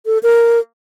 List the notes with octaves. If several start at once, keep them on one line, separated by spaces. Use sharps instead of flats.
A4
A#4